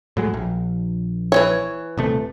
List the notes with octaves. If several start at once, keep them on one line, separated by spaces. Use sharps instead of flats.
A2 F#3 G#3
A#1
E3 C#4 C#5
D#1 C3 A3